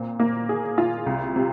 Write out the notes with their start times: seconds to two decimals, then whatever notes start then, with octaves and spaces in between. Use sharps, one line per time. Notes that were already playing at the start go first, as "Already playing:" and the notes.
Already playing: A#2 C4
0.19 A#3
0.49 G#4
0.78 F4
1.06 C2
1.36 C3